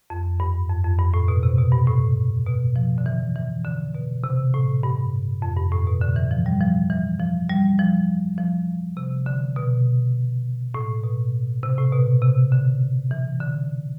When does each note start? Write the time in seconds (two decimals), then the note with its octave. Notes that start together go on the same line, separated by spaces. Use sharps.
0.10 F2
0.40 G2
0.69 F2
0.84 F2
0.99 G2
1.14 A2
1.28 B2
1.43 C3
1.58 B2
1.72 G2
1.88 A2
2.47 B2
2.76 F3
2.98 D3
3.06 E3
3.36 E3
3.65 D3
3.94 B2
4.24 C3
4.54 A2
4.83 G2
5.42 F2
5.57 G2
5.72 A2
5.87 B2
6.01 D3
6.16 E3
6.31 F3
6.46 G3
6.60 F3
6.90 E3
7.20 F3
7.49 G3
7.79 F3
8.38 F3
8.97 C3
9.26 D3
9.56 B2
10.74 A2
11.04 B2
11.63 C3
11.78 A2
11.92 B2
12.22 C3
12.52 D3
13.11 E3
13.40 D3